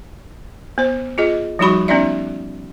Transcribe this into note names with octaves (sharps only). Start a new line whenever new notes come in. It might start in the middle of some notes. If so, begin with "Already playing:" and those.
B3 C5
F4 G#4 D#5
F3 G3 D#4 F#4 B5 C#6
B3 C#4 D#4 D5 E5